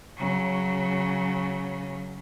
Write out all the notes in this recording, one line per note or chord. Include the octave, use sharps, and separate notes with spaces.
C#3 F#3